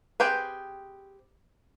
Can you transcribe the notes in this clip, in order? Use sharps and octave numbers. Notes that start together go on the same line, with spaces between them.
C4 G4 G#4 B4